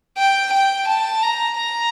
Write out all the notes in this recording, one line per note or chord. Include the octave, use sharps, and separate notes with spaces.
G5
G5
A5
A#5
A#5